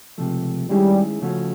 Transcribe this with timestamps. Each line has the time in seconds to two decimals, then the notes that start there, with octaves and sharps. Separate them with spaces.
0.18 C#2 C3 F3 A3
0.70 D#3 G3 G#3 C#4 E4 G#4
1.22 C#3 F3 A3 C#4 F#4